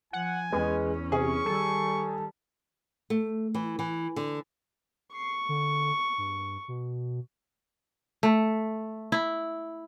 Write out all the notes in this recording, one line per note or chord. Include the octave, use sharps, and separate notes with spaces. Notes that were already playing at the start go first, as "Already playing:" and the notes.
F3 F#5 G#5
E2 G#3 B3 C#4
C3 G#4 C#6
D#3 G3 A4
A3
E3
E3
D3
C#6 C7
D3
G2
B2
A3
E4